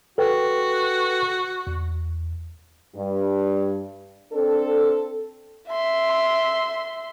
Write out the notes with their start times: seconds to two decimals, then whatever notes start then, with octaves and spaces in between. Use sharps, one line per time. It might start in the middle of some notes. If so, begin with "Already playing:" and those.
0.18 F#4 A4 B4 G5
1.67 E2
2.96 G2
4.33 C4 D4 A4
5.69 E5 C6